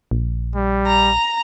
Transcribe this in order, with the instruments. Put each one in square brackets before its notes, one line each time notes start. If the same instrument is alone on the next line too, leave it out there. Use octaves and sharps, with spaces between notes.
[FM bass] A#1
[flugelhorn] G3
[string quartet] A#5